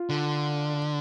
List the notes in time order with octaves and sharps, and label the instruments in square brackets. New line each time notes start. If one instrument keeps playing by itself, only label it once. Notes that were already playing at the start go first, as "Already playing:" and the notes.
Already playing: [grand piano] F4
[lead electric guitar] D3